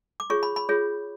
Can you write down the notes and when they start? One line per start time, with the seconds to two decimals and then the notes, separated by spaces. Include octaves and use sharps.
0.20 D6
0.30 F4 G#4 C#5 C#6
0.43 B5
0.56 B5
0.69 F4 G#4 C#5